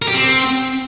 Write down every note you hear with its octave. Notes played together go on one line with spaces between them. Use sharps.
A#4
G4
C4